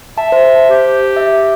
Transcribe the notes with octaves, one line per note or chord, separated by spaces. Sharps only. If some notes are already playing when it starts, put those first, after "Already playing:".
E5 A5
C5
G4
E5